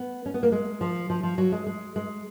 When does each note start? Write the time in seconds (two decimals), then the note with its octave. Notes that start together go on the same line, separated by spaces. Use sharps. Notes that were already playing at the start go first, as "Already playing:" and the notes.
Already playing: B3
0.26 C#4
0.34 B3
0.43 A#3
0.52 G#3
0.81 F3
1.10 F3
1.23 F3
1.38 F#3
1.52 G#3
1.66 G#3
1.96 G#3